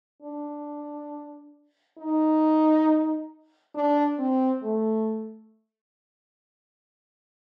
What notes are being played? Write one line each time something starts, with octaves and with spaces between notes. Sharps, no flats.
D4
D#4
D4
C4
A3